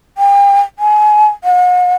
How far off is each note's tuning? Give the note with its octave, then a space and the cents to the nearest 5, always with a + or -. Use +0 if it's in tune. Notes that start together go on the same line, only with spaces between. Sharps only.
G5 +35
G#5 +25
F#5 -45